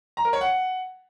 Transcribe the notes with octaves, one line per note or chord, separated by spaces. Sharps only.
A#5
A#4
C#5
F#5